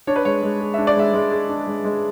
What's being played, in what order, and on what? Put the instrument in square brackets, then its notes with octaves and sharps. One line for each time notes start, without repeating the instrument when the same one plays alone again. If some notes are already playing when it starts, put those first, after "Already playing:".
[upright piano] D4 [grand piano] C#5
[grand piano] B4
[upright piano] G#3 [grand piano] C#5
[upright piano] G#3
G#4
[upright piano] D4 [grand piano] E5
[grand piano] D5
[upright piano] G#3 [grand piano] E5
[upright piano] G#3
G#4
D4
G#3
G#3